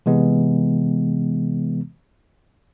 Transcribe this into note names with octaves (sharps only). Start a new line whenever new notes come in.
C3 E3 G#3 B3